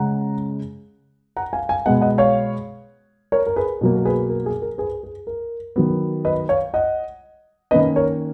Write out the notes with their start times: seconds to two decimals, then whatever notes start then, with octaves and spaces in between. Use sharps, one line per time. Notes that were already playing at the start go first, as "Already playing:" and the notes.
Already playing: C#3 G#3 C#4 F#5 A#5
1.37 F#5 A#5
1.53 F5 G#5
1.69 F5 G#5
1.86 B2 G#3 B3 D#5 F#5
2.01 D#5 F#5
2.18 C#5 F5
3.32 A#4 C#5
3.47 A#4
3.56 G#4 B4
3.81 B2 F#3 A#3
3.96 A#4
4.05 G#4 B4
4.30 A#4
4.46 G#4
4.62 A#4
4.78 G#4 B4
5.03 G#4
5.27 A#4
5.76 D#3 F#3 B3
6.25 B4 D#5
6.49 C#5 F5
6.74 D#5 F#5
7.71 D#3 A#3 C#4 B4 D#5
7.96 A#4 C#5